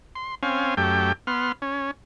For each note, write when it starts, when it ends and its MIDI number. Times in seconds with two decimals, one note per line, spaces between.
0.15 0.35 84
0.43 0.74 60
0.43 0.74 61
0.43 0.74 77
0.43 0.74 80
0.77 1.12 42
0.77 1.12 57
0.77 1.12 67
0.77 1.12 79
1.27 1.52 59
1.27 1.52 84
1.27 1.52 89
1.62 1.91 61